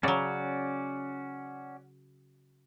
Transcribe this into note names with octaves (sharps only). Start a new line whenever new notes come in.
C#3 F#3 C#4 F#4 D5